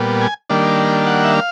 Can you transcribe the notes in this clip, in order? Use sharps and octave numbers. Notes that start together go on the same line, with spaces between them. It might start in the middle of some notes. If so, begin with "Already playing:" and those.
Already playing: A#2 G3 B3
G#5
D#3 G3 A#3 D4
F#5
E5
F5